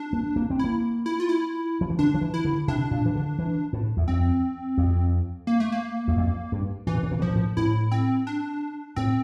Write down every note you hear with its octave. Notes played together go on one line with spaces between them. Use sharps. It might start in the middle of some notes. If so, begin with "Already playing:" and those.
Already playing: D4
A#3
A#3
C4
A#3 E4
E4
F4
E4
F3
E3
D3 D4
F3
E3
E4
D3
C3 D4
A#2
E3
D3
E3
A2
E2
F2 C4
F2
A#3
A3
A#3
E2
F2
G2
A2 E3
A#2
A2
A#2
A2
F3
A#2
A2
A2 E4
C4
D4
A2 C4